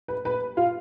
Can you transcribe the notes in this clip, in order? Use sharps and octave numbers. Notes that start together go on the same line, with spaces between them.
B4
B4
F4